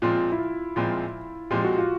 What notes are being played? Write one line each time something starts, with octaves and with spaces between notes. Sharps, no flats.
A#2 F3 G#3 C4 F4
E4
F4
A#2 F3 G#3 C4
A#2 F3 G#3 C4 G4
F#4
F4